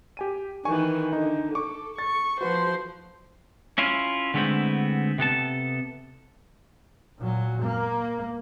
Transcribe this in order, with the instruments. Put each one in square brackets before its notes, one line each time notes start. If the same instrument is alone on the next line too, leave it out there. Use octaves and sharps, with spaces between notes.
[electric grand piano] G4 G#5 D#7
[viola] D#3 E3 [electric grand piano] G#5 C#6
[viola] D3 [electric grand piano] D#4
[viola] A4 [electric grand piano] C#6 D6
[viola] C#6 [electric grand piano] A6
[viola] F3 C5 [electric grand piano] F#4 B4
[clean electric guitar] C#4 E4 F4
D3 G#3 A3 B3 C4 E4
C3 B3 A4 A5
[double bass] A#2 F#3
A#3